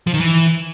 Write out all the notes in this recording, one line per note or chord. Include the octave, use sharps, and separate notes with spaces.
F3
D#3
E3